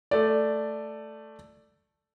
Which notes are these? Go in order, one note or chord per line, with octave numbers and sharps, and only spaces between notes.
A3 D5